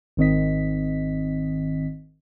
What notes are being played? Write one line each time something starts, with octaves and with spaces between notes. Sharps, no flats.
G#1 D#3 C4 D#5 B6